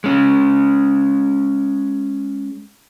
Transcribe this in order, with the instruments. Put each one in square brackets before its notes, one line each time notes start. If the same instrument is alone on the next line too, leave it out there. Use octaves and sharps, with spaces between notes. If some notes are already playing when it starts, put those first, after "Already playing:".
[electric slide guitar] G#3 C#4